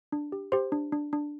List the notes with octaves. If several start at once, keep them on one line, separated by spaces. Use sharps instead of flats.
D4
G4
G4 C5 C6
D4
D4
D4